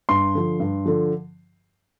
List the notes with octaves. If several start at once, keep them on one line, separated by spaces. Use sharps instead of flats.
G2 C6
D3 F3
G2
D3 F3